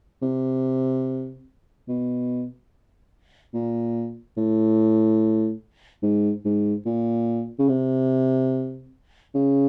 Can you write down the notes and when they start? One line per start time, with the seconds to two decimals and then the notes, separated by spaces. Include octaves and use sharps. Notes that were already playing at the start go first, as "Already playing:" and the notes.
0.22 C3
1.88 B2
3.54 A#2
4.37 A2
6.03 G#2
6.45 G#2
6.86 A#2
7.59 C#3
7.69 C3
9.35 C#3